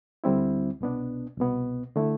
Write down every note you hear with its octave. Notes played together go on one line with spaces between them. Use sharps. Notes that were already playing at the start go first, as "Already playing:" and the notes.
D2 D3 G3 C4 E4
C2 B2 B3 D4
C2 B2 B3
D3 A3 E4